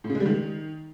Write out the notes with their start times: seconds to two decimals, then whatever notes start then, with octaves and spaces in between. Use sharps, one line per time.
0.04 A2
0.10 C#3
0.15 G#3
0.20 G3
0.26 D#3